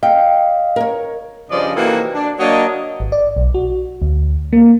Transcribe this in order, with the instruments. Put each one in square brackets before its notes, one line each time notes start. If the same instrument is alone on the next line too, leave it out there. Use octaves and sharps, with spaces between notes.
[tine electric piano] D#5 F5 [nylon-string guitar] G5
[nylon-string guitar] A#4 C#5
[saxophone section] G2 C#3 F3 D4 D5 D#5
C3 E3 A#3 D#4 F#4 A4
D4
F#3 A#3 D4 C#5 D#5
[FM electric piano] G#1
D5
B1
F#4
D2
A#3